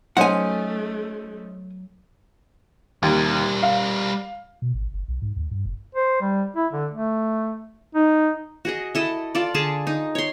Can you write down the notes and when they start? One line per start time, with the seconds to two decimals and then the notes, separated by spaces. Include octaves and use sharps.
0.17 F#3 A3 C#4 D#4 C5 F#5 G#5
3.03 D#2 G3 A#4
3.63 F5
4.62 B2
4.74 G#1
4.93 F#1
5.08 B1
5.22 G#2
5.36 D#2
5.51 G2
5.65 F1
5.95 C5
6.21 G3
6.56 E4
6.73 D3
6.91 A3
7.95 D#4
8.65 F#4 G#4 D#5
8.95 E4 A4 D#5
9.35 F4 A4 D5
9.54 D3 G#4 A5
9.87 D#4
10.15 C#5 C6